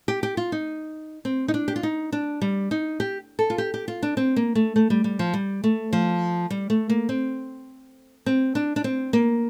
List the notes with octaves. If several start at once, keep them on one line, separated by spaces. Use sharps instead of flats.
G4
G4
F4
D#4
C4
D#4
D4
G4
F4
D#4
D4
G3
D#4
G4
A4
F4
G4
G4
F4
D4
C4
A#3
A3
A3
G3
G3
F3
G3
A3
F3
G3
A3
A#3
C4
C4
D4
D4
C4
A#3